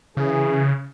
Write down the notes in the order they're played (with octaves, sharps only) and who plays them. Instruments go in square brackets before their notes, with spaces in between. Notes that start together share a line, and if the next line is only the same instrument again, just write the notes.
[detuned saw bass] C#3 [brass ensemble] E3 G#4